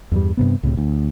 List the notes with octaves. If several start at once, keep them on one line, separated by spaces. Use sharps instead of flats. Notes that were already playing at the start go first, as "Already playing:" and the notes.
E2 G2 G3
G2 C3 B3
C#2 A2 C3
D2